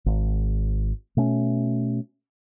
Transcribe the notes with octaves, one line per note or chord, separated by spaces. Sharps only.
G#1
B2 A3 C#4